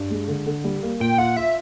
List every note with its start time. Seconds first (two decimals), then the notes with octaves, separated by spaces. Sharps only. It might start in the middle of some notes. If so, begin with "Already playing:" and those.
Already playing: G2
0.10 G#3
0.28 D3
0.46 D3
0.64 G3
0.83 A#3
1.00 A#2 G5
1.18 F4 F#5
1.37 F4 E5